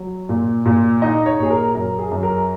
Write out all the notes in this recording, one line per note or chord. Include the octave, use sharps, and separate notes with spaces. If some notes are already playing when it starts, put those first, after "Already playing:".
Already playing: F#3
A#2
A#2
D#4 D#5
C#5
A#2 G#4
A#4
F#2 A#4
G#4
F#2
A#4